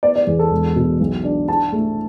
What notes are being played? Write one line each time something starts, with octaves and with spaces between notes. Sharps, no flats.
B3 D5
D5
E2
A4
E1
B2
B1
D4
D4 A5
A3